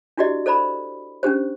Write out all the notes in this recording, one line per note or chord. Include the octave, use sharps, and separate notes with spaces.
D4 E4 F#4 G4 D5 D#5
A4 C5 D5 A#5 B5
C#4 D4 G4 C5